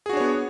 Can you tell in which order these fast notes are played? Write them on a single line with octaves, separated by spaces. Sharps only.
G#4 F#4 D4 C#5 B3